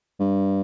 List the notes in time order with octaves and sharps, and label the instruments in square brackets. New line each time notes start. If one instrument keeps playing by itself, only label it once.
[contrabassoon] G2